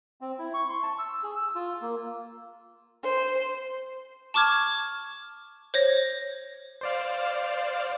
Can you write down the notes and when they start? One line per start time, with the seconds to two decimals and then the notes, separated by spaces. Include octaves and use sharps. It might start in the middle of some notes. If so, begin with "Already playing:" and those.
0.21 C4
0.39 E4
0.54 C#6
0.69 C6
0.83 A5
0.99 E6
1.23 G#4
1.35 E6
1.55 F4
1.82 A#3
3.03 C5
4.34 A5 C#6 D6 F6 G#6
5.74 C5 C#5 A#6
6.81 C5 D5 F5